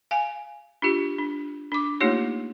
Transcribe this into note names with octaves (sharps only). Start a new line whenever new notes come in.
F5 G#5
D4 F4 G4
D4
D4 D6
A3 A#3 D#4 F4 G4 C#5